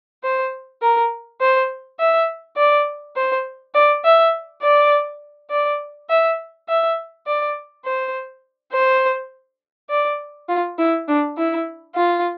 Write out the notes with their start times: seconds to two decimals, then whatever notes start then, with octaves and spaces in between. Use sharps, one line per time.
0.24 C5
0.82 A#4
1.41 C5
1.99 E5
2.57 D5
3.16 C5
3.75 D5
4.05 E5
4.63 D5
5.50 D5
6.09 E5
6.69 E5
7.27 D5
7.85 C5
8.73 C5
9.90 D5
10.49 F4
10.79 E4
11.08 D4
11.37 E4
11.95 F4